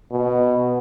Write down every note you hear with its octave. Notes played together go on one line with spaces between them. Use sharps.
B2